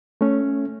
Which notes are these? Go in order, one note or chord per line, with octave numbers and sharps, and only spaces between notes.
A3 C#4